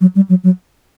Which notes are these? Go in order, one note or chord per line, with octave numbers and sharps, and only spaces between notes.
F#3
G3
F#3
F#3